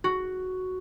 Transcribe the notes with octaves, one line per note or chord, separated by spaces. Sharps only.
F#4